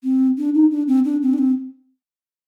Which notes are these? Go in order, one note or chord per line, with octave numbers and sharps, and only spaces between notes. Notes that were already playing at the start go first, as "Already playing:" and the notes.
C4
D4
D#4
D4
C4
D4
C4
D4
C4